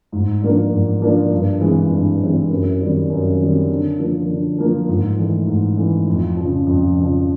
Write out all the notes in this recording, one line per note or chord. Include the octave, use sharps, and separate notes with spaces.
G#2
F3 A#3 D4
G#2
F3 A#3 D4
G2
E3 G#3 C4
G2
E3 G#3 C4
F#2
D#3 G3 C4
F#2
D#3 G3 C4
D3
F3 A#3
D3
F3 A#3
G#2
E3 A3
G#2
E3 A3
F2
C#3 F3
F2
C#3 F3